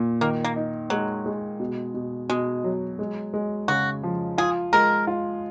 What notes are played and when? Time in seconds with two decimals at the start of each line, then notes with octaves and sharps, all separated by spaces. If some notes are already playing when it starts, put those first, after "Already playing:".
Already playing: A#2
0.21 D#3 A#3
0.44 A#3
0.56 D#4
0.90 F#3 G#3
1.26 G#3
1.60 B2
1.94 B2
2.29 B2 G#3
2.64 F#3
2.99 G#3
3.34 G#3
3.68 C#3 F#4
4.03 F3
4.38 F4 G#4
4.73 G#3 A#4
5.07 F4